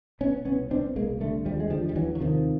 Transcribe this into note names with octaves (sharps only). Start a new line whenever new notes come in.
B2 B3 C#4
C2 B3 C#4
B2 C4 D4
C2 G#3 A#3
D3 G3 A3
D#2 F3 G3
G#3
D3 F3 G3
G3
D#2 E3 F#3
F#3
C3 D#3 F3